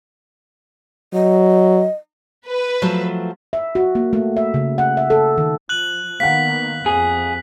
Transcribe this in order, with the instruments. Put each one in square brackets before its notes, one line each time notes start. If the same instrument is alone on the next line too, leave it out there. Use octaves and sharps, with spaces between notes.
[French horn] F#3 [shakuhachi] D#5
[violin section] B4
[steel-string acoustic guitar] F3 F#3 A3
[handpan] E5
F#4
A#3
A3
E5
C#3
F#5
E5
A4
D#3
[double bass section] F3 [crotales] F#6 F#7
[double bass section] D#3 A#3 B3 [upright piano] F5 F#5 [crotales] B6
[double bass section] F2 [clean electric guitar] G#4